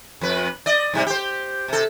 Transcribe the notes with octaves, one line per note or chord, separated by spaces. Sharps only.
F2 B4
D5 D#5
G#2 C3 G3
G4 C5
C3 A4